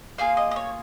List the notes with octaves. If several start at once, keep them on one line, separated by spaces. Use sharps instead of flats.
A#3 F4 G#4 F5
D#5
D#5
C#5